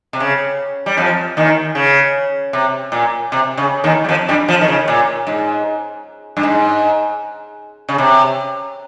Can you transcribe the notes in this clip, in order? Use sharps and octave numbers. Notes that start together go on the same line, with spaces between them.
C3
C#3
G3
F2 F3
D#2 D#3
C#3
C3
A#2
C3
C#3
D#2 D#3
G3
F2 F3
G2 G3
F2 F3
D#3
C#3
A#2
G#2
G2
G#2
C#3
C3